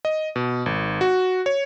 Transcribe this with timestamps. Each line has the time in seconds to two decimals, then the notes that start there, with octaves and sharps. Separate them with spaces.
0.05 D#5
0.36 B2
0.66 G#1
1.01 F#4
1.46 C#5